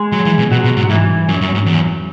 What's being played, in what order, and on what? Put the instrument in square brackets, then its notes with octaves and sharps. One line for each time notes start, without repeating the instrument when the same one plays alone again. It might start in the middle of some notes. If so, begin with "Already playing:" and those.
Already playing: [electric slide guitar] G#3 G#4
[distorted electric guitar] F#3
E3
B2
[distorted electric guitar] B2 [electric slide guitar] F#3 F#4
[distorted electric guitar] B2
G#2
[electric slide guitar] F#4
[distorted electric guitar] G#2 [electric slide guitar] E3 E4
[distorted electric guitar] F#2 [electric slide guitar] F#3
[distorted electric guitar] F#2
G#2
E2